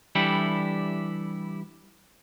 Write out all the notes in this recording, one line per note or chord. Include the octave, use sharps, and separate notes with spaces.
E3 G3 D4 E4 G4 A4